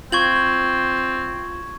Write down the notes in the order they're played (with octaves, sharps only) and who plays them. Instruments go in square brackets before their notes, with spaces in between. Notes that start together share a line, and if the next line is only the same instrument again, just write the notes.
[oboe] C4 [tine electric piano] F4 [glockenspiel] C#6 G#6 F#7